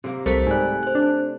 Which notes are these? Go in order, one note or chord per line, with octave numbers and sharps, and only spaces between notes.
C3 A#3
C2 A3 A#4 C5 B6
G#2 G3 G#5 F#6
C5 F#6
D4